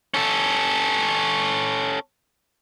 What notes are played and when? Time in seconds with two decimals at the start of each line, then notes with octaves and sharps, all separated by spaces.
0.14 C#4 A4